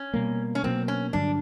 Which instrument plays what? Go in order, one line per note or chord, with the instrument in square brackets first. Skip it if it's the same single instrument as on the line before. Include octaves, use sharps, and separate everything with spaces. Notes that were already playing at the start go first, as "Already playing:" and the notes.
Already playing: [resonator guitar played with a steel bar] C#4
[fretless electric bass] B2 G3 A#3
[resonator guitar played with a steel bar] C#4
[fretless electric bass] B2 F#3 A#3 [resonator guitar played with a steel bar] C4
[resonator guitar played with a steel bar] C#4
[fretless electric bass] G2 D3 F#3 [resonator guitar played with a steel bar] D4